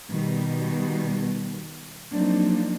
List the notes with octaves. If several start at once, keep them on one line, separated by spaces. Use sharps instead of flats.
B2 D#3 G3
F3 F#3 A#3 C4 D4 D#4